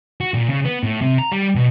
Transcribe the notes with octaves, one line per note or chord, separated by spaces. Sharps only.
F#4
A#2
C#3
B3
A2
C3
A#5
G3
B2